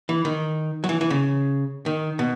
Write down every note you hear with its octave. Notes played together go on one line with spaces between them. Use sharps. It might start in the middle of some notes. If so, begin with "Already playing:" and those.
E3
D#3
F#3
E3
E3
C#3
D#3
B2